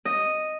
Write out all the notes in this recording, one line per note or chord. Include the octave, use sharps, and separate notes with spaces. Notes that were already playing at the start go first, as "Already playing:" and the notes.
D#5